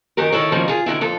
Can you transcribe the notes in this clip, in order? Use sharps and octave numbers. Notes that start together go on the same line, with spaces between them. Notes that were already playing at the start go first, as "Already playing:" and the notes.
F#2 D#3 G4 A#4
D#3 E4 A4 C#5
B2 D#3 F3 G3 A#3 C#4
F4 G#4
D3 D#3 F3 E4
F2 F4 A4